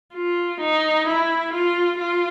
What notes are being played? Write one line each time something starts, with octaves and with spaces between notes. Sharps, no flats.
F4
D#4
E4
F4
F4